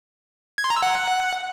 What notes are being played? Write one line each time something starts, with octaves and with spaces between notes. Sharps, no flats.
G#6
C6
A#5
E6
F#5